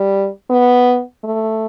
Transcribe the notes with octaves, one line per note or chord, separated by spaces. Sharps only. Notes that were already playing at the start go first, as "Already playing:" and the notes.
Already playing: G3
B3
A3